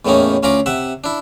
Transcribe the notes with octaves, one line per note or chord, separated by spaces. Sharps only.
E2 A2 D#3 A#3 C#4 D#4
D2 C#4 F4 A#5 B5 D6
C3 E5 F#5
D4 E4